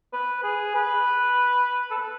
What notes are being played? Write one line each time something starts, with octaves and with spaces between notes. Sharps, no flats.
B4
G#4
B4
A4
B4